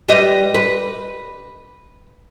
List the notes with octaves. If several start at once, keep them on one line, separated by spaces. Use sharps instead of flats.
G3 B4 D#5
B4